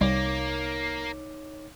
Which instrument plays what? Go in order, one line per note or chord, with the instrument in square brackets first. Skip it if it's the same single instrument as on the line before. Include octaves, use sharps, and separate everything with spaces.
[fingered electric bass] C2 [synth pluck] G3 [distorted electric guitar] A#3 [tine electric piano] D#4 C#5 D6